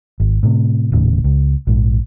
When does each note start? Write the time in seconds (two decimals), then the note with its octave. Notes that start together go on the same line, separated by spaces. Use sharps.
0.20 G#1
0.43 A2 C3
0.92 D#1 D#2 A2 C#3
1.24 C#2
1.67 A#1 G#2